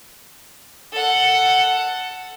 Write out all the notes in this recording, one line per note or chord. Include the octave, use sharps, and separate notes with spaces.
A4 F#5